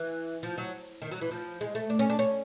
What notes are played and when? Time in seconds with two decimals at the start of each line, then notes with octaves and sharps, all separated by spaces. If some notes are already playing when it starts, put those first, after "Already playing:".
Already playing: E3
0.43 F3
0.58 F#3
1.02 D#3
1.11 F#3
1.21 E3
1.31 F3
1.61 G#3
1.75 A3
1.90 D4
1.99 C#4
2.10 D4
2.19 C#4